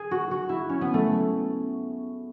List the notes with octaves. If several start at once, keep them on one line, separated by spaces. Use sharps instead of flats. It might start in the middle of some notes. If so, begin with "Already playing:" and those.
Already playing: G#4
F#4
F#4
E4
C#4
B3
A3